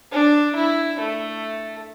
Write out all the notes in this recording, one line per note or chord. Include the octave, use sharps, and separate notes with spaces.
D4
E4
A3